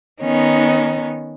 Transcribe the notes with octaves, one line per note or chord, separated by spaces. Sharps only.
D#3 B3 C#4 D#4